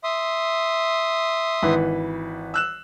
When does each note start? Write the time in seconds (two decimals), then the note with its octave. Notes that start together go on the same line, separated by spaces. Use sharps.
0.04 E5 C6 D#6
1.63 G#1 E3 B4
2.54 E6 F#6 E7